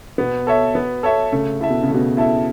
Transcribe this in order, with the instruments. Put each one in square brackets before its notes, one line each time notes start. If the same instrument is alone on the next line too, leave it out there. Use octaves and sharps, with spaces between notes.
[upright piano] B2 [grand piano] B3
[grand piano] A4 C#5 E5
B3
A4 C#5 E5
[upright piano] C#3 [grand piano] A3
[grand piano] E4 A4 E5
[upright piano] B2
C#3
[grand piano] A3
[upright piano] B2
[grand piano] E4 A4 E5